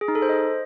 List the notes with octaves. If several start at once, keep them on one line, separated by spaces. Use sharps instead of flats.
G#4
D#4
A4
C5
D#5